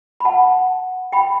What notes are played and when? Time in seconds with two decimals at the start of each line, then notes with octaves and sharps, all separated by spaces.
0.20 B5
0.25 F#5 A5
1.12 G5 B5